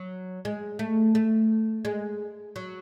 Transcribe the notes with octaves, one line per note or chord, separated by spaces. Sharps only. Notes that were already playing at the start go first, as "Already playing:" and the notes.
Already playing: F#3
G#3
A3
A3
G#3
F#3